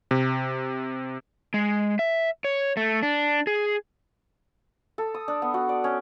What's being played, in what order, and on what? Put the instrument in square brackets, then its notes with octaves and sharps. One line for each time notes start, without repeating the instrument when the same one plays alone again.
[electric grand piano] C3
[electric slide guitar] G#3
E5
C#5
A3
D4
G#4
[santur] A4
D#6
D4
B3
F#4
D5
C#4